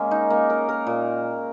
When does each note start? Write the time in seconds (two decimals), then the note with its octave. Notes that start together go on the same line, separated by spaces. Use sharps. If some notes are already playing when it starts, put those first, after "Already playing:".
Already playing: G#3 A#3 C#4
0.11 D#4
0.30 A#3
0.50 A#4
0.69 A#4
0.87 A#2